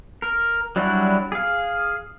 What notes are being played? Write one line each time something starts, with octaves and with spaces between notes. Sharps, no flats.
A#4
F#3 G3 D4 E4 F#4
G#4 F5